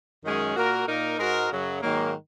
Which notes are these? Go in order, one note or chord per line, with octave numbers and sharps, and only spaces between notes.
F#2 D#3 G#3 C#4 G#4
A#2 A#3 F#4 A#4
A#2 A#3 D#4 A#4
G#2 G#3 F#4 A#4
F#2 C#3 F#3
G#2 D#3 F#3 A#3